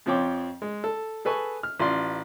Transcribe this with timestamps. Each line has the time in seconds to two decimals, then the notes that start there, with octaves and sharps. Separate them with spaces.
0.06 F2 F3 C4 C#5 G5 D6
0.62 G#3
0.84 A4
1.25 G#4 A4 B4 G#5 C#6
1.63 F6
1.80 A1 F4 D5 C6